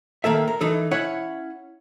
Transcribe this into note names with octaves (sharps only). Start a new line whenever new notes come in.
D#3 A#3 A4 E5
A#4
E3 D#4 A4
C#4 E4 C#5 F#5